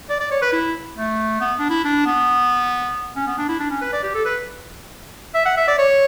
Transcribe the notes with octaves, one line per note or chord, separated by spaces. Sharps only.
D5
D5
C#5
B4
E4
A3
B3
D4
E4
D4
B3
C#4
B3
D4
E4
D4
C#4
B4
D5
G4
A4
B4
E5
F#5
E5
D5
C#5